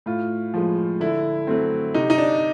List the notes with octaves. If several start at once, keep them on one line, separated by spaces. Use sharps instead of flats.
A2 F4
F3 G#3
D3 E4
F#3 A3 C4
C3 D#4
D#4
D4